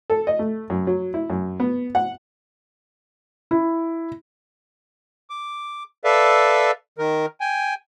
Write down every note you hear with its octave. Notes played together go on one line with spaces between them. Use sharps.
A4
D#5
A3
F#2
F#3
E4
F#2
B3
F#5
E4
D6
A4 B4 D5 E5 F5
D#3 A#4
G5 G#5